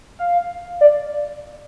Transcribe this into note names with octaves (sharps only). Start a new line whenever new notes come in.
F5
D5